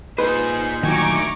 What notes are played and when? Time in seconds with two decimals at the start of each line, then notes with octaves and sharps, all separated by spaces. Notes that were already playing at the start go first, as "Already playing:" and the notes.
0.19 A#2 D#4 G#4 B4 C5
0.83 D2 D#3 F#3 G#5 A#5 C#6 D6